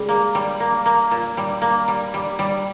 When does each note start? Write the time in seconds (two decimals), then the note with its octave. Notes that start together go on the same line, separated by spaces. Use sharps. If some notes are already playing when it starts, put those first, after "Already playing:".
Already playing: C#3 G3 G#3 G#4
0.08 A#3
0.35 G3
0.60 A#3
0.85 A#3
1.11 A#2
1.37 G3
1.62 A#3
1.88 G3
2.14 G3
2.39 G3